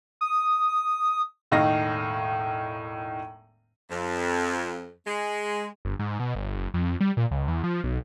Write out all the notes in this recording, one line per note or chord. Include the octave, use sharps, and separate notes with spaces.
D#6
E1 A2 D#3 D#4 F5 A#6
F2
G#3
G1
G#2
B2
G1
F#1
F2
G3
A#2
C#2
E2
F3
B1